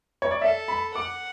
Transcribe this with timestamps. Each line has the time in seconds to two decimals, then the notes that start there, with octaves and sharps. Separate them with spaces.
0.22 C#5
0.31 D5
0.41 A4 E5
0.68 B5
0.95 F#5 D6